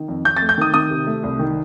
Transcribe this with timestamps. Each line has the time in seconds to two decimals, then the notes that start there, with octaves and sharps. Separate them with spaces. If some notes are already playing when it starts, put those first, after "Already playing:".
Already playing: D#3
0.08 F2
0.25 F2 G6
0.37 A6
0.42 A3
0.49 G6
0.58 D#3 D#6
0.74 D#3 D#6
0.91 C3
1.07 A3
1.23 C2
1.39 D#3